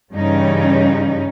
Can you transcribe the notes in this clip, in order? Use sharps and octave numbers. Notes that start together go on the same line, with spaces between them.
G2 C#3 E3 G3 C#4 D#4